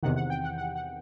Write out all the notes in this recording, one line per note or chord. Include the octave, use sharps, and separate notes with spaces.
E2 C3 D#3 F#5
F#5
G5
F#5
F#5
F#5